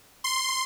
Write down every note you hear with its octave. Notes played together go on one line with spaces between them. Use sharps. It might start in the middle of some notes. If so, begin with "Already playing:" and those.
C6